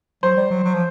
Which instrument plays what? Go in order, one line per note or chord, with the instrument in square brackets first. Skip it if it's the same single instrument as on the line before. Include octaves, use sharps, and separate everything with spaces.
[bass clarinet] F#3 [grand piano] C5
[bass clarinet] G3
F#3
F#3
F3